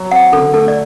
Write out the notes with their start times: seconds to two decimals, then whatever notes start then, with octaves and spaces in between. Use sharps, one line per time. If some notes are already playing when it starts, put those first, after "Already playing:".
Already playing: F#3
0.11 C4 F#5
0.32 D3 A4
0.53 A3 A4
0.68 D5